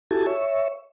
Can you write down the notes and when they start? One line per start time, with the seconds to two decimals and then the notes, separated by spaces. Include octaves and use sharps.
0.11 E4 F#4 G4 A4 G#5 A5
0.27 C#5 E5